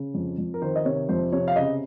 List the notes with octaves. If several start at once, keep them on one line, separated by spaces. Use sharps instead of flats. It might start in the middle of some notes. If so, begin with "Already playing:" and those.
Already playing: C#3
F2
F2
A#4
D#3 C5
D#5
C3 C#5
F2 C5
C3 C#5
F5
C#3 D#5